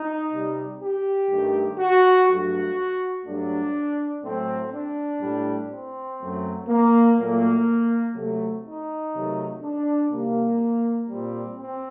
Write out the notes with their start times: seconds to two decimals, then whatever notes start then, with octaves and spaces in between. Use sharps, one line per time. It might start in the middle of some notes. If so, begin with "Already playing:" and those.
Already playing: D#4
0.32 C3 G3
0.81 G4
1.30 G2 D#3 A3
1.79 F#4
2.28 G2 F#3 A3 F#4
3.26 G2 F#3 A3 D4
4.24 A2 F#3 A3 C4
4.73 D4
5.22 A2 G3
5.71 C4
6.20 F#2 F#3 A3
6.68 A#3
7.18 A#2 F#3 A3 A#3
8.15 C3 F#3 A3
8.64 D#4
9.13 C3 D#3 F#3 A3
9.62 D4
10.11 C3 D#3 G3 A#3
11.09 A#2 G3 C4
11.59 C4